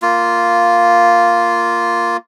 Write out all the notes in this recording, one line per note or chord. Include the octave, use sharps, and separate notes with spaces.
A#3 F4